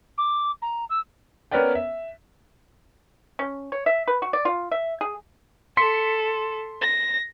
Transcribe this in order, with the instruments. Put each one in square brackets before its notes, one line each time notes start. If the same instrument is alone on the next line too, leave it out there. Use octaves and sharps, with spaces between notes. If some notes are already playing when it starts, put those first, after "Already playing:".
[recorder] D6
A#5
E6
[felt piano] B3 C#4 A#4 B4 D5 G5
E5
[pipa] C#4
C#5
E5
B4
F#4
D5
F4
E5
G#4
[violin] A4 [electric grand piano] C6 B6 C#7
[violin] A#6